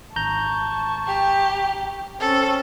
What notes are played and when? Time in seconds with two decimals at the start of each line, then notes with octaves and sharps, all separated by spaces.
0.16 G#1 A5 A#5 C#6 G6
1.07 G4
2.20 C4 C#4 A4